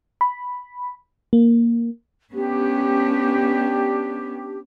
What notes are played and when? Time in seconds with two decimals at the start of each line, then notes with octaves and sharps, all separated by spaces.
0.21 B5
1.33 A#3
2.33 B3 C#4 D4 G4